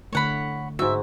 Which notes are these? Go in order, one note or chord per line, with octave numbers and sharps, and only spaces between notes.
D3 A3 C#5 F#5 B5
G#2 F#4 E5